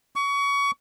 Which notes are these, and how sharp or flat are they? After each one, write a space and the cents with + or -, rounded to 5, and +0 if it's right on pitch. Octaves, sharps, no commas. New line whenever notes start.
C#6 +25